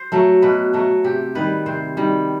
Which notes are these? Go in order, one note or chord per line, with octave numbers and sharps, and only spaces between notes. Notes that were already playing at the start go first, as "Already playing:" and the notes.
Already playing: C5
F#3 A3
B2 B4
F#3 A3
C3 G4
D#3 G3 B4
C3 C5
D#3 G3